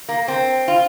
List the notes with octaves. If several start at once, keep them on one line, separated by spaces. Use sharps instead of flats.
A#3
C4
F4